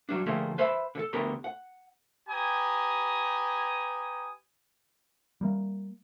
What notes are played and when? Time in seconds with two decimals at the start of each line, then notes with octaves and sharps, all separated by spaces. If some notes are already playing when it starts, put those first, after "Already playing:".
0.09 F#3 G3 D4
0.26 D3 F3 A3 A#3 G4 G#4
0.58 B4 C5 E5 B5
0.95 D3 A4
1.13 D2 D3 B3 G4 A#4 C6
1.44 F#5
2.29 G4 B4 G#5 A#5 D#6
5.41 G3 A#3